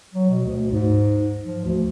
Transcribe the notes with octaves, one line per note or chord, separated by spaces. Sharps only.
F#3
B2
D2
G#2
F3
D2